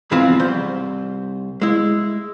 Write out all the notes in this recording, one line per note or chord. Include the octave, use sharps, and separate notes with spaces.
G#2 E3 F3 B3 C4 F4
C2 C5
G#3 E4